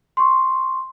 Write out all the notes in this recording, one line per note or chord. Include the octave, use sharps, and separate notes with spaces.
C6 C#6